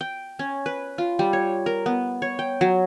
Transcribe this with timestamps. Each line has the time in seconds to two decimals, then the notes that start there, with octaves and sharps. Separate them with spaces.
0.01 G5
0.39 C#4
0.66 B4
0.98 F4
1.19 G3
1.33 C#5
1.66 A#4
1.86 B3
2.22 C#5
2.39 G5
2.61 F#3